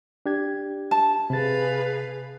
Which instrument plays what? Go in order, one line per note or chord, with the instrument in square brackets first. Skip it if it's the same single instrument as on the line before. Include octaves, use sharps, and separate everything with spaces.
[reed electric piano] D4 G4 G#6
[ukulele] A5
[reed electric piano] C3 A6 [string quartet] G#4 B4 F5